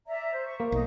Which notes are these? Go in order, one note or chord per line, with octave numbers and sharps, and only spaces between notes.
D5 E5 A#5
C5
C#6
A#3
B1 D#4